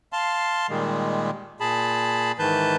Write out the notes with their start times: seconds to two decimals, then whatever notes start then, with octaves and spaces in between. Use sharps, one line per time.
0.13 F5 A5 C6
0.70 A#2 D#3 G3 G#3
1.60 A#2 G#4 A5 B5
2.39 G#2 D#3 E3 B4 A5 G6